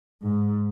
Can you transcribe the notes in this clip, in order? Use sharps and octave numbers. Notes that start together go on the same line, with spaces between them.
G#2